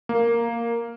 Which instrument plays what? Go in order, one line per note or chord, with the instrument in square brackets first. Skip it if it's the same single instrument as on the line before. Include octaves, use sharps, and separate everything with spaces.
[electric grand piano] A#3